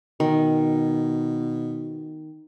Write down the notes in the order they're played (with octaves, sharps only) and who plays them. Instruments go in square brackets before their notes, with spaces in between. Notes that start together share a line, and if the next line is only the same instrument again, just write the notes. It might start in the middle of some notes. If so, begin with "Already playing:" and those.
[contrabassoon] B2 [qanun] D#3